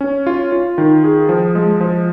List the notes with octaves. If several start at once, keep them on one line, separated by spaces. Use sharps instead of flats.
C#4
F4
F4
D#3
G#4
F3
G#3
F3